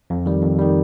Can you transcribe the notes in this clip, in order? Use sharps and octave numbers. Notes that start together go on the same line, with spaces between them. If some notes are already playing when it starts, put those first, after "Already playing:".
F2
D#3 G3
F2
D#3 G3